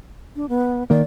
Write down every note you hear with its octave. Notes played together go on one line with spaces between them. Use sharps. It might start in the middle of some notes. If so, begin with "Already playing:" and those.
D4
B3
D#3 A#3 D5